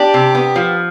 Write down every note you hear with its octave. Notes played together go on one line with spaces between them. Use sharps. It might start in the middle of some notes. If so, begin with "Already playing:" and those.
Already playing: D4 G4
C3
B3
F3